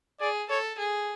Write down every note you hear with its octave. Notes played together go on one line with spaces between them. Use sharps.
G#4 D5
A4 C#5
G#4